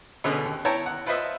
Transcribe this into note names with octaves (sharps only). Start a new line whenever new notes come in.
B2 D3 B3 C#4 G#4
D#2
E4 C#5 G5 A5 A#5
F#5
F4 B4 C5 D#5 E5